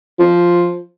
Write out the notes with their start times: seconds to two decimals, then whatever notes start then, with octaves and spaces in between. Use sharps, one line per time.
0.19 F3